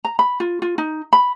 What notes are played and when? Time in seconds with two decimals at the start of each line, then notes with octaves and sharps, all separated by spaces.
0.05 A#5
0.19 B5
0.40 F4
0.62 F4
0.78 D#4
1.13 B5